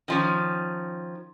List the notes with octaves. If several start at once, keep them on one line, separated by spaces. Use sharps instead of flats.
D#3 F3 C#4